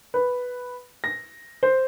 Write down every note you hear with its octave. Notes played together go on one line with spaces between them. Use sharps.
B4
A#6
C5